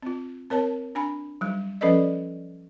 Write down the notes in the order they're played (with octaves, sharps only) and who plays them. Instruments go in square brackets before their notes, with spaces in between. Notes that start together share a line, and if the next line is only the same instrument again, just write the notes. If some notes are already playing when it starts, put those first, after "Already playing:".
[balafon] C4 F4
C4 A#4 C#5 A5
D4 G#5 B5
F#3 G3
F3 C#4 A4 B4 D5 D#5